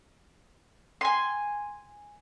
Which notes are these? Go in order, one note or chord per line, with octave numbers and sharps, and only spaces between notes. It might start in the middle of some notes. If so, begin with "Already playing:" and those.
G#5 C6